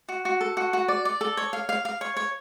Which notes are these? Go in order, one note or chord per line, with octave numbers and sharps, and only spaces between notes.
F#4
F#4
A4
F#4
F#4
D5
D5
A4
C#5
F5
F5
F5
C#5
C#5